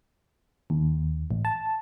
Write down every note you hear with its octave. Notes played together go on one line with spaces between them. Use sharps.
D#2
A1
A5